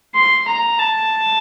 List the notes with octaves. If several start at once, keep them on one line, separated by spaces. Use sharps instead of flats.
C6
A#5
A5